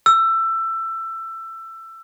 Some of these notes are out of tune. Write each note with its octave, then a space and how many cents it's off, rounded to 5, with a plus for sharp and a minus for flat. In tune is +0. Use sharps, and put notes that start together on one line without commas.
E6 +20